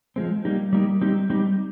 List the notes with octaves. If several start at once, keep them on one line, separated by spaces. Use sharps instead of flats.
F3 G#3 C4
G3 A#3 D#4 G4
G3 A#3 D#4 G4
G3 C4 D#4 G4
G3 C4 D#4 G4